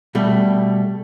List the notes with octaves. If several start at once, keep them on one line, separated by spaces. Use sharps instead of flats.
B2 G3 A3